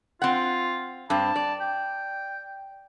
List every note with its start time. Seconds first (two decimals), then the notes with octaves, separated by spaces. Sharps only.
0.22 C4 F4 F#5
1.10 G2 C4 A5
1.36 D5
1.60 G5